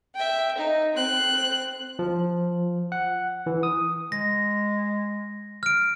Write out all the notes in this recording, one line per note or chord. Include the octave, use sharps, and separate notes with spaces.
E5 G5
D#4
C4 F#6
F3
F#5
E3
D#6
G#3 A#6
F6 D7